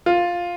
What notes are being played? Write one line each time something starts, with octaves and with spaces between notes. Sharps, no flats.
F4